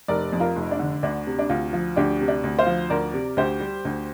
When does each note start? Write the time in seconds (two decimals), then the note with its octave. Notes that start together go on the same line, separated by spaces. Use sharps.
0.08 F1 A#4 D5
0.33 F2
0.40 F4 A#4
0.56 F1
0.71 D4
0.79 D3
1.03 D2 D4
1.27 C3
1.39 D4
1.49 D2 F4
1.73 F3
1.96 D2 D4 G4
2.21 C3
2.28 D4
2.44 D2
2.59 C5 F5
2.66 F3
2.90 D2 A#4 D5
3.14 C3
3.37 D2 G4 C5
3.60 G3
3.85 D2